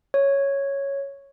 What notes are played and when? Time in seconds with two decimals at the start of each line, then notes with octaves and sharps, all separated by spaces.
0.14 C#5